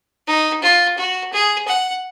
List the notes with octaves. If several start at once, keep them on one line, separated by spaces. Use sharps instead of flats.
D#4
F4
F#4
G#4
F#5